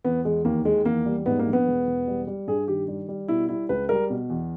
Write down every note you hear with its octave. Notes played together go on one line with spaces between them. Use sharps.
E2 B3
E2 G#3
D#2 A#3
D#3 G#3
E2 A#3
G3
G#2 B3
A#3
A#1
B3
E1
E1
G3
G3
G2 G#4
D#3 G4
G3
G3
B2 E4
G3 E4
C#2 B4
G3 A#4
B2
E2